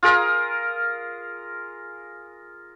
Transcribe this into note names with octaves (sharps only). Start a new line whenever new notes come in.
F4 G#4 A#4